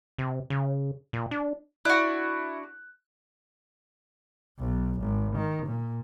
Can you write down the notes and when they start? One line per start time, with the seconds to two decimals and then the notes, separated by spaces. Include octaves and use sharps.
0.18 C3
0.50 C#3
1.13 A#2
1.31 D4
1.85 D4 E4 F#4 F#6
4.59 B1
5.00 G#1
5.36 D#3
5.66 A#2